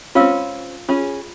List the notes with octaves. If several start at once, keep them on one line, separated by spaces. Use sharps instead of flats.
C4 C#4 F4 F5 E6
C#4 F4 G#4